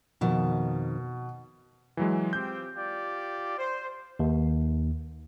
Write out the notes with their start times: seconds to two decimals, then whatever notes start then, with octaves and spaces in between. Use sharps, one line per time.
0.21 F2 B2 D#3
1.97 E3 F#3 G#3
2.33 C4 F4 G4 G6
2.75 F4 G4 D5
3.58 C5
4.19 D#2